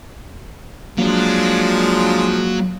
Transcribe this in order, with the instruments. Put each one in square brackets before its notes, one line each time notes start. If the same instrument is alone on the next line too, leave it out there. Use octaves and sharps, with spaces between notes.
[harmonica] F3 G#3 D4 [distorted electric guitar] F#3 [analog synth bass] A#3